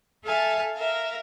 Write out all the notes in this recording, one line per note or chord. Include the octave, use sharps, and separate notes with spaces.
A4 E5 F5 G#5 A5
A#4 E5 F5